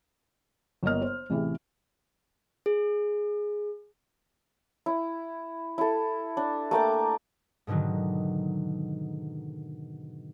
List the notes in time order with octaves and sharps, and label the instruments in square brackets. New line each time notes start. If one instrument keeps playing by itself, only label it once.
[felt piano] G1 A#3 B3 D#5 F6
C5
A1 C3 E3 G#4
[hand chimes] G#4
[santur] E4
E4 A4
D4
A3 A#3 G5 D6
[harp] G#2 B2 D3 D#3 F#3